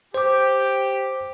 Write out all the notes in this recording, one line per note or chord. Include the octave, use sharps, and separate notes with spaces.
G4 C5 D6